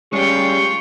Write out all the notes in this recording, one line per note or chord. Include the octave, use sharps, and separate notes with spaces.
G3 G#3 C#4 F4 G4 G5 C#6